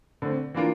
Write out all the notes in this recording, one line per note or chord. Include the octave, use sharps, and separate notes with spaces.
D3 A3 C4
E3 A#3 D4 F4 A#4